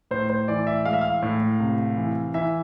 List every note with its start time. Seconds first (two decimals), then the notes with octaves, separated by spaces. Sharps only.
0.11 A2 C5
0.29 C5
0.48 E3 D5
0.67 E5
0.85 G#3 F5
0.93 E5
1.01 F5
1.22 A2
1.60 C2
1.97 E3
2.34 E3 E5